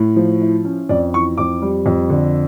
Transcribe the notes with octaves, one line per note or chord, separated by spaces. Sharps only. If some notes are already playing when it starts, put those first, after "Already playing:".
Already playing: A2
F3
E4
C#4
F2 D5
E3 C#6
F2 D6
G3
F2
D3